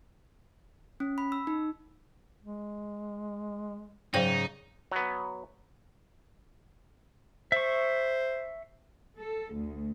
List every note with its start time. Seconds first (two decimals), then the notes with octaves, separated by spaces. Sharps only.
1.00 C#4
1.18 B5
1.32 E6
1.47 D#4
2.42 G#3
4.14 G#2 C#3 F#3 D#4 C5 G5
4.92 F#3 B3
7.52 C5 E5 C#6
9.17 A4
9.54 D2